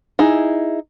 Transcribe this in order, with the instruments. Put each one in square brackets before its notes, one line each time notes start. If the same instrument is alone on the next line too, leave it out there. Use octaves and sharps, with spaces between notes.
[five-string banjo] D#4 E4 G#4